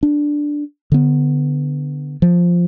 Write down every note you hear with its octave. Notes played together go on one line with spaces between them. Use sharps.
D4
D3 B3
F3